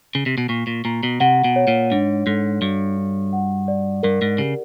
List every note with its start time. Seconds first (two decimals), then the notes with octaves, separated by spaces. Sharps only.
0.15 C#3
0.26 C3
0.38 B2
0.49 A#2 C#6
0.67 A#2
0.85 A#2 A#5
1.03 B2
1.20 C3 F#5
1.44 B2
1.56 C#5
1.68 A#2
1.91 G#2 D4
2.27 G#2 A4
2.62 G2 F#4
2.97 D4
3.33 F#5
3.68 D5
4.03 G2 A#4
4.22 G#2
4.38 C#3 G4